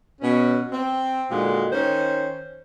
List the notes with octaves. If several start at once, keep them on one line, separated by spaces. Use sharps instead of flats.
B2 C#4
C4
A#2 D3 D#3 G#3 F#4
D#3 C#4 C5